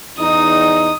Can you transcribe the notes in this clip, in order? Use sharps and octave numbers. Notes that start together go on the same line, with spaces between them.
E2 D#4 D#6